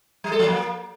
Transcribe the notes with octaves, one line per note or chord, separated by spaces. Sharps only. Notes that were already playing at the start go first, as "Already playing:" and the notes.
G3
A4
F3
A#3